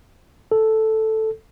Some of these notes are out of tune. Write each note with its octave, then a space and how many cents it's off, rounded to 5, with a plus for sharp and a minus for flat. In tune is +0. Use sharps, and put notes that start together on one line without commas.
A4 +0